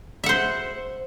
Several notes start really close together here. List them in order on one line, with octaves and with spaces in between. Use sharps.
E5 F#5 C5